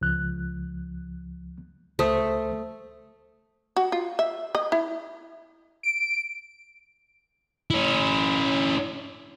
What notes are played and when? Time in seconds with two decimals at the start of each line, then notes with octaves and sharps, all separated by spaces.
0.01 C#2 F3 F#6
1.99 C#2 A3 C5 D#6
3.76 F#4
3.92 F4
4.19 E5
4.55 D#5
4.72 E4
5.83 D7
7.71 C#4 E4